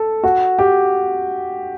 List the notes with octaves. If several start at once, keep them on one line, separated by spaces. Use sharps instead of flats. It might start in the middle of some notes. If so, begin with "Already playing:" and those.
Already playing: A4
F#4
G4